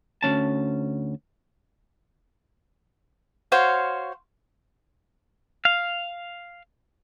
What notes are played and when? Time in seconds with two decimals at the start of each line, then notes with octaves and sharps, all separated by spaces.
0.23 D2 A#3 C#4 A5
3.52 F#4 C5 C#5 F5
5.65 F5